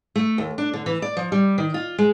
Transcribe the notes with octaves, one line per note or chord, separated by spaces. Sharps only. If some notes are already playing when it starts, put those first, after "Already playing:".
A3
D#2
D4
D3
E3
D5
F3
G3
D#3
F4
G#3